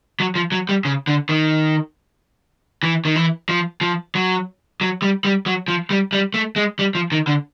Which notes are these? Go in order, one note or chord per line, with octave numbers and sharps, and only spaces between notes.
F#3
F3
F#3
G3
C#3
D3
D#3
E3
D#3
E3
F3
F3
F#3
F#3
G3
G3
F#3
F3
G3
G3
A3
G#3
G3
F3
D#3
D3